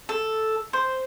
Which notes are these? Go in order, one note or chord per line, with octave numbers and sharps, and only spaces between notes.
A4
C5